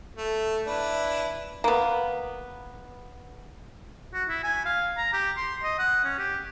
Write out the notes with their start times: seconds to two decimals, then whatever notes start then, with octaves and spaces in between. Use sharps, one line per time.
0.16 A3
0.67 D4 E4 B4
1.64 A#3 B3
4.14 F#4
4.29 E4
4.44 G#5
4.65 F5
4.97 A#5
5.13 G4
5.37 C6
5.63 D#5
5.79 F#5
6.05 C#4
6.19 G4